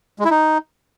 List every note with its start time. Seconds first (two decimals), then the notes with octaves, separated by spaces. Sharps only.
0.19 G#3
0.25 E4
0.31 D#4